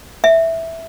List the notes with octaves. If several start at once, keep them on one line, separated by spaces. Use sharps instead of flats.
E5